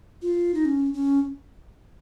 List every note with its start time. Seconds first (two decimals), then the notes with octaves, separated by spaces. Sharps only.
0.22 F4
0.54 D#4
0.65 C#4
0.94 C#4